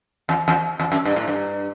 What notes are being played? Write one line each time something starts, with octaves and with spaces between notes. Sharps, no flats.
E2
E2
E2
F#2
G2
A2
G2